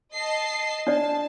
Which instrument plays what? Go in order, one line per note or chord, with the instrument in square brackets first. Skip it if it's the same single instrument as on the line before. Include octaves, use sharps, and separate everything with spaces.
[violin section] D#5 A5 C7
[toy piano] D4 D5 [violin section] A5